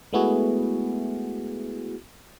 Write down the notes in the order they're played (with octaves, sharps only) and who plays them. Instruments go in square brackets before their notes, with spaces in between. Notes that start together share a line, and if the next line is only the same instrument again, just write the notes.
[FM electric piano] G#3 A3 B3 E4 F#4 G#4